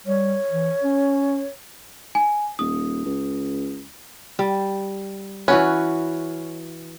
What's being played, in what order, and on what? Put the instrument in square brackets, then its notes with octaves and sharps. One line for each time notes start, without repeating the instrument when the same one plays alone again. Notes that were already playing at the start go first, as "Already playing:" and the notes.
[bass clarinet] G3 [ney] C#5
[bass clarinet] E3
C#4
[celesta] G#5
[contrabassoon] D#1 [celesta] D#6
[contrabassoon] C#2
[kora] G3
[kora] E3 F#4 B4 [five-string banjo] C#4